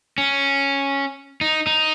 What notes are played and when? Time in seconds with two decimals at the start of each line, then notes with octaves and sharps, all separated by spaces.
0.18 C#4
1.41 D#4
1.67 D#4